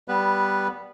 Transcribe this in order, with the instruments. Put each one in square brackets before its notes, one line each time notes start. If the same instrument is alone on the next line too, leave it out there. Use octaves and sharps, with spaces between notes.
[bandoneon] G3 B3 B4